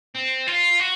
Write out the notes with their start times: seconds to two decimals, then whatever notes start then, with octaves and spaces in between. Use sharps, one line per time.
0.16 C4
0.48 F4
0.80 F#4